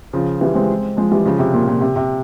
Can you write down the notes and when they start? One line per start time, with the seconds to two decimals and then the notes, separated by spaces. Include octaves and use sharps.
0.13 C#3 F3
0.41 E3 G3
0.55 G#3 C4
0.97 F3 G#3
1.11 E3 G3
1.25 C#3 F3
1.39 C3
1.53 A#2
1.68 A#2
1.81 C3
1.96 C3